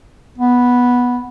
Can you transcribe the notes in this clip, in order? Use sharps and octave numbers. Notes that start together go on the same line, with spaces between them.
B3